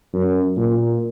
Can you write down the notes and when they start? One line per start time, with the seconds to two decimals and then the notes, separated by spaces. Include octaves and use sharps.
0.14 F#2
0.57 A#2